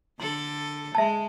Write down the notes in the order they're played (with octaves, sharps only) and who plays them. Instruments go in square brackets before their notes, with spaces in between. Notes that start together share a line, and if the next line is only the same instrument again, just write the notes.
[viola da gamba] D3 A4 [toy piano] C6
[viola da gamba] G#3 [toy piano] E5 A5